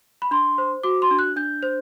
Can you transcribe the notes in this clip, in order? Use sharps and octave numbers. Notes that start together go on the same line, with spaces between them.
B5
D4 C6
C5
F#4 D6
C6
D4
F#6
D4 G6
C5